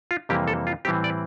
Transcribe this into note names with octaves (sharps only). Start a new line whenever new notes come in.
F4
F2 C3 E3 G3 A#3 G4
A4
F4
A2 E3 G3 C4 G4
D5